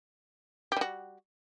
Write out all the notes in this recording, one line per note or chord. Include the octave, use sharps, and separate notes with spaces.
G3 F#4 G4